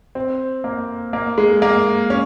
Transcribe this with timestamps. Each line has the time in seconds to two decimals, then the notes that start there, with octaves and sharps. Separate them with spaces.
0.15 C4
0.64 A#3
1.13 A#3
1.38 G#3
1.62 A#3
2.10 C#4